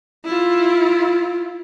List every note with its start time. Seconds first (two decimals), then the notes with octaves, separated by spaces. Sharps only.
0.25 E4 F4